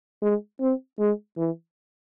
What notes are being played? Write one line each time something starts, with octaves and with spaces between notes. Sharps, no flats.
G#3
C4
G#3
E3